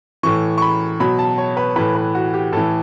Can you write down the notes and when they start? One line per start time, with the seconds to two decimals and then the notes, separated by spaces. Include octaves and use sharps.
0.23 A2 E3 C#6
0.58 C#6
0.62 B5
1.00 B2 F#3 B5
1.19 A5
1.38 C#5
1.57 B4
1.76 A2 E3 B4
1.95 B4
2.15 F#4
2.34 G4
2.53 A2 E3 A4